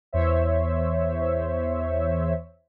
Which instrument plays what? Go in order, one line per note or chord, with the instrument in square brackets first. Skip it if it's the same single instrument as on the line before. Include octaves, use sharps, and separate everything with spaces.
[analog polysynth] E2 C5 C#5 E5